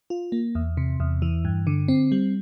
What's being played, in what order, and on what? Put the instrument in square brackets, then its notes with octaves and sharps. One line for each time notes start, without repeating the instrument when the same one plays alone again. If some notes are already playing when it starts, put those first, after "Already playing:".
[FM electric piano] F4
A#3
E2
C3
E2
E3
G2
D3
C4
G3